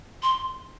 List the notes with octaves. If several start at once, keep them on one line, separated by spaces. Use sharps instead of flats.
C6